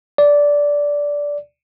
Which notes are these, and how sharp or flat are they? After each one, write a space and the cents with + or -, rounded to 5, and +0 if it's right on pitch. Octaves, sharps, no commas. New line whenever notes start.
D5 -10